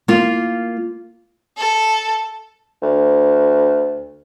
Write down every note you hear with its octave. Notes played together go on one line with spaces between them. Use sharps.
A#3 F4
A4
D2